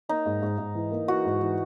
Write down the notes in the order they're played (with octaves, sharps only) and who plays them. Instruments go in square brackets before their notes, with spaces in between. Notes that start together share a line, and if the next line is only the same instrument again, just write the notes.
[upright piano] A#3 [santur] D#4
[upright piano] G#2
G#2
G#2
E3
A#3
[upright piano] E3 [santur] F#4
[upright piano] G#2
E3